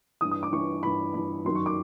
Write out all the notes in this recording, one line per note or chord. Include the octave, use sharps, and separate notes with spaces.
G2 E3 D#6
D#6
D6
G2 E3 C#6
G2 E3 B5
G2 E3 B5
F#2 D#3 F#3 C6
C#6
D6